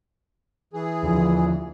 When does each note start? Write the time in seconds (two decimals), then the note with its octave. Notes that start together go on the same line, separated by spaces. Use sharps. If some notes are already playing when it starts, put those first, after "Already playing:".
0.73 E3 G#4
1.03 D#2 D3 F3